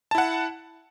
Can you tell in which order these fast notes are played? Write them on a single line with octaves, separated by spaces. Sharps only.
A5 E4 F#5